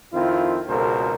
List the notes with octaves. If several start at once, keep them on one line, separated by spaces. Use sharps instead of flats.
F2 D#3 C4 E4 F4
G#1 C#2 B2 A4 A#4 C5